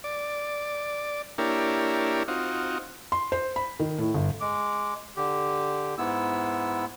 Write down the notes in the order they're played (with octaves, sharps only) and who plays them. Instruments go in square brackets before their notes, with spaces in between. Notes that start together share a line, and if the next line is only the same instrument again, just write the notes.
[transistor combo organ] D5
A#3 D4 E4 G4 A#4 C#5
C4 D#4 F4 F#4
[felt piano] C6
C5
B5
D#3
A2
G1
[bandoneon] G#3 D6
D3 G4
G#2 B3 E4 E6